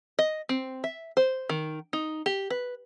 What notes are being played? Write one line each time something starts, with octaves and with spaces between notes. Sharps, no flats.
D#5
C4
E5
C5
D#3
D#4
G4
B4